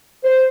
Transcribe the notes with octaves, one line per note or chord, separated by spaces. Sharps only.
C5